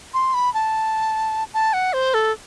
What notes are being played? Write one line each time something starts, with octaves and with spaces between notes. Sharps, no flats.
C6
B5
A5
A5
F#5
C5
A4